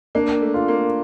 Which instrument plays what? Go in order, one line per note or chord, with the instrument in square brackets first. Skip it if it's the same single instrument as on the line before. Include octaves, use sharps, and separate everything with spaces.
[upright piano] A#3 [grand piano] D4
[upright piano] A3
[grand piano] F4
[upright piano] A#3